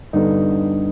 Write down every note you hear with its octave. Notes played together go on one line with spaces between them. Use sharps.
G2 D3 G3 B3 D#4